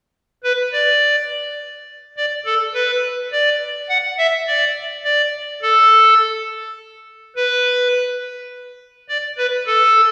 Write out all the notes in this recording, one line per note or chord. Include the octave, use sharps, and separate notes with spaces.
B4
D5
D5
A4
B4
D5
F#5
E5
D5
D5
A4
B4
D5
B4
A4